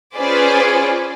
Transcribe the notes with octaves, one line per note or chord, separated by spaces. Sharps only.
C#4 F4 G#4 B4 C5 D5